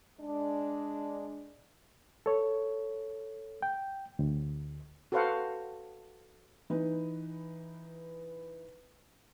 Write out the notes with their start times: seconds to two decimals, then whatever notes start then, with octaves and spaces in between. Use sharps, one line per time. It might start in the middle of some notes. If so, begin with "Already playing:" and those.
0.19 G#3 D4
2.26 A4 C#5
3.62 G5
4.19 D2
5.12 F#4 A4 B4 C5 F5 F#5
6.70 E3 D#4 B4